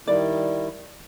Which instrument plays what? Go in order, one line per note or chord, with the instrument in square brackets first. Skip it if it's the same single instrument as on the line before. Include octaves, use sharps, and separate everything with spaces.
[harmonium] D#3 G3 E4 [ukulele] D5